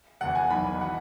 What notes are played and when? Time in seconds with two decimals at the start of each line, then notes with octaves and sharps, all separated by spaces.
0.21 E1 E2 E3 F#5
0.35 G#5
0.50 B1 B2 B5
0.81 E3 F#5